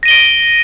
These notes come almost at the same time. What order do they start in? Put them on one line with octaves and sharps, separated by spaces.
A#6 D#7 G7 D7